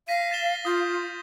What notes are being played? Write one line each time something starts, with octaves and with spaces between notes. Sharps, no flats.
F5 A#6 B6 D#7
A6 E7 G7
F4 D#6 G6